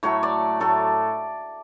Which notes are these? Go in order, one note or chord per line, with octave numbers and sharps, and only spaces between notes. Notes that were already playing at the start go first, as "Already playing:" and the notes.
A2 F#3 A3 C#5
D5
A2 F#3 A3 A4